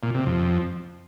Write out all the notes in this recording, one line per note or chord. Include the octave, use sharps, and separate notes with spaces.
A#2
C3
F2